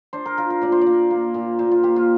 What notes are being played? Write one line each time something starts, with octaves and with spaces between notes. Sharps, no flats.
D4 C5
A#4
F4 A#4
A#4
A#2 D5
C5
D5
A#3
A#3
A#2
A#2 C5
F4
A#3 G4
F4